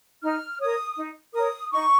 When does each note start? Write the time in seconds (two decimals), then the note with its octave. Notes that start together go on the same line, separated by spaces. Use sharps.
0.23 D#4 F6
0.60 A#4 C#5 D#6
0.97 D#4
1.34 A#4 C#5 D#6
1.72 D#4 C#6